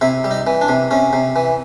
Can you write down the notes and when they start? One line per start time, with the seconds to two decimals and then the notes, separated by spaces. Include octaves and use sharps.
0.01 C3 E4
0.24 G3
0.31 D#4
0.47 E3
0.61 D4
0.68 C3
0.91 C3 C#4
1.13 C3
1.36 E3